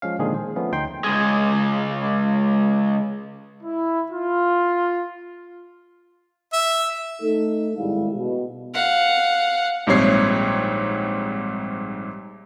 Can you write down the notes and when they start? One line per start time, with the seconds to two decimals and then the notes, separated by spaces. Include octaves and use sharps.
0.02 F3 G#3 C#4 F5
0.19 A#2 D3 D#3 F3 G#3 G#4
0.34 C5
0.56 F3 A3 B3 C#4
0.72 D2 D#4 G5 C6
1.04 C#2 G#3
3.63 E4
4.11 F4
6.53 E5
7.22 A3 D#4 A4
7.78 G#1 A2 G3 G#3 E4 F5
8.15 B2
8.74 F5 F#5
9.87 A#1 G#2 G3 C4 C#5 C7